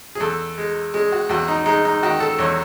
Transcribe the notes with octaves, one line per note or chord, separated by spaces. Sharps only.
G#4
E2 A4
G#3
G#3 G#4
F#4
E2 F#4
D#4
G#3 D#4
D#4
D#3 F#4
A4
E2 C#5